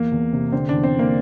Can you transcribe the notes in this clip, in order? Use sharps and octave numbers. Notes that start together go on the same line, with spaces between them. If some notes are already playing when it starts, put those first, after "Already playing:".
Already playing: E2 A#3
E2
C3
D3 C4
E2 D4
C4
D3 A#3